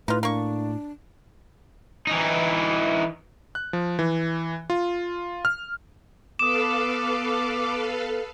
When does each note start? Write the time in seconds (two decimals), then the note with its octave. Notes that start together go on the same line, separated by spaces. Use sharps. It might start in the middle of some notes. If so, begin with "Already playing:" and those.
0.08 A2 D#4 F4 B4
0.23 A#3 D4 C#6
2.07 E3 D#4
3.55 F#6
3.73 F3
3.99 E3
4.70 F4
5.45 F6
6.39 B3 A4 B4 F5 D6 D#6 E7